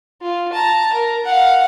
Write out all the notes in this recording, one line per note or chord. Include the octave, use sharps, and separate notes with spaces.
F4
A5 A#5
A#4
F5 F#5